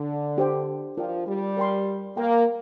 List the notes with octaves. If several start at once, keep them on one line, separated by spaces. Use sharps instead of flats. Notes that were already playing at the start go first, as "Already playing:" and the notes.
Already playing: D3
D4 G4 C5 G5
F3 F4 A#4 D5 G5
G3
A#4 D5 G5 C6
A#3 A#4 G5 A#5